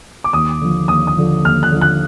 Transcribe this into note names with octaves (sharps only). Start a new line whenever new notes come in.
D6
D#2 D#6
D3 F3
D#2 D#6
D#6
D3 F3
D#2 F6
F#6
D3 F3
F#6